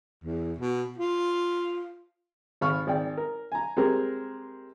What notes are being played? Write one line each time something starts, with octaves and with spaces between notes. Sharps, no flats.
E2
B2
F4
G#1 F5 B5 C#6 F6
G#1 D5 G5
A#4
G#5 A#5
G#3 C4 G4 A#4